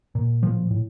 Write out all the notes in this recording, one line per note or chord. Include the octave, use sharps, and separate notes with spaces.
A#2
A2 F3
A2